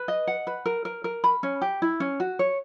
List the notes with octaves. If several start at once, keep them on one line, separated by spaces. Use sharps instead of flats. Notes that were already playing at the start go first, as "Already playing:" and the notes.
Already playing: B4
D#5
F#5
B4
A#4
A#4
A#4
B5
C#4
G4
E4
C#4
F#4
C#5